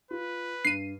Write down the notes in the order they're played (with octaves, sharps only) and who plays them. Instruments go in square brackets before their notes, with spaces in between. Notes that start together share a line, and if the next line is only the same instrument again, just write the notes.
[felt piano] F4 [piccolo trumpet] B4
[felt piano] G2 [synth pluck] C7 D#7